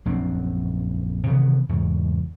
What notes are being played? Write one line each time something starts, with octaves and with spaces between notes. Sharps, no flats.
A#1 F#2 C4 D4
C3 D#3 E3 B3
E2 G#2 C#3